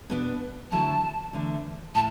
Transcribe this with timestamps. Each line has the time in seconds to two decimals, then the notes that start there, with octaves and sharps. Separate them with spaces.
0.10 B2 B3 D4
0.72 D3 F#3 A3 E4 A5
1.33 E2 D3 A3 D4
1.95 A2 A5